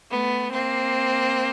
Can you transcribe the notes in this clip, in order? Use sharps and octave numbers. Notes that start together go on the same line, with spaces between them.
A3 B3
A#3 C4